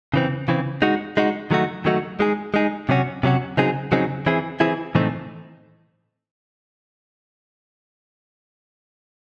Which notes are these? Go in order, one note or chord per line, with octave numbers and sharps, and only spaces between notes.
C#3 E3 C4
C#3 E3 C4
G#3 D#4 F#4
G#3 D#4 F#4
D#3 F#3 A3 D#4 F#4
D#3 F#3 A3 D#4 F#4
G#3 D#4 G#4
G#3 D#4 G#4
C3 F#3 C#4 F#4
C3 F#3 C#4 F#4
C#3 F#3 C4 D#4 G#4
C#3 F#3 C4 D#4 G#4
E3 C4 E4 G#4
E3 C4 E4 G#4
A2 E3 A3 C4 D#4